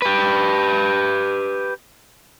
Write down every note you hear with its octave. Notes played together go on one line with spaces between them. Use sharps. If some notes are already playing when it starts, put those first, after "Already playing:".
G4 B4